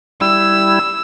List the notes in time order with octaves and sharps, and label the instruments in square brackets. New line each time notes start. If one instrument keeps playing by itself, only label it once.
[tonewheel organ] G3 E4 [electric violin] E6